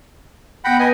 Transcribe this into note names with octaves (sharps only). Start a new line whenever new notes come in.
B3 F#5 G5 B5 A#6
B4 D#5 G#5